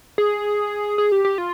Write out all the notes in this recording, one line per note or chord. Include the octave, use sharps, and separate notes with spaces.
G#4
G#4
G4
G4
F4